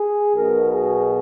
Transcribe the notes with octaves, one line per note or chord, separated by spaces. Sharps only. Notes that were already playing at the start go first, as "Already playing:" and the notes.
Already playing: G#4
B1 B2 A#4
G#4